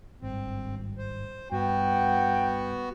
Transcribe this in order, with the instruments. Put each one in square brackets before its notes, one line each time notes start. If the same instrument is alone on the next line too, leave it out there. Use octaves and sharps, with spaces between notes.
[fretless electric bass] G#1 G2 [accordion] C4
[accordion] C5
[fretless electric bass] G2 [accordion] B3 F#4 [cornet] G5